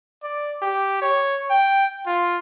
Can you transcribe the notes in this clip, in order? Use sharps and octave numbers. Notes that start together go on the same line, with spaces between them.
D5
G4
C#5
G5
F4